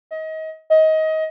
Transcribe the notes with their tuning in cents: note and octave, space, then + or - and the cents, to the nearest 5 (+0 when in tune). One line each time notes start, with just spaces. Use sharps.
D#5 +30
D#5 +25